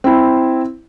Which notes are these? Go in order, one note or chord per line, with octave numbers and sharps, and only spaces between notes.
C4 E4